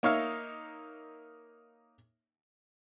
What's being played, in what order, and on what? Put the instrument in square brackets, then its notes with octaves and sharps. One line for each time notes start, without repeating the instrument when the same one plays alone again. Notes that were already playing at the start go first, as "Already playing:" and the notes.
[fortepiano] A#3 D#4 C#5 E5 F5